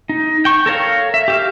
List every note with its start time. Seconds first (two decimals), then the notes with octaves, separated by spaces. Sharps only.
0.09 D#4
0.45 G5 C#6
0.66 A4 A#4 C#5 F5
1.14 E5
1.28 G4 E5 F5